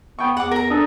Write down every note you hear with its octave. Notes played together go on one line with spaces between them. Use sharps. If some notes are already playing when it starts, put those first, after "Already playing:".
B3 G5 C#6
E2 F#5 D6
A#4 A#5
D4 A4 D#6